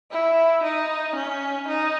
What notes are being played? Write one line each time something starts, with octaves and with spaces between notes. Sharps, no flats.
E4
D#4
C#4
D#4